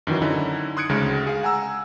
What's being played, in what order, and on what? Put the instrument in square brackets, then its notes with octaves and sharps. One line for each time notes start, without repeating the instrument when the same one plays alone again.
[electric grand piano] F#2 D#3 E3 F#3
D3 C#4 D#4 E4
C6 D#6 F#6 G#6 C#7 D7
D2 C#3 G#3
G#4 F5
F#5 G#5 A#5 E6